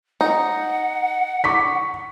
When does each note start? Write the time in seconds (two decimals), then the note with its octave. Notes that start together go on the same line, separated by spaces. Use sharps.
0.21 D#4 F#5
1.44 C#6 D6 B6